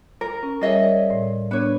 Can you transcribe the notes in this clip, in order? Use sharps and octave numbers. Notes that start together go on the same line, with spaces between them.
A#4
C#4
G3 G#4 A#4 C#5 D#5 E5
C#5 D5
A2
B3 D4 B4 C#5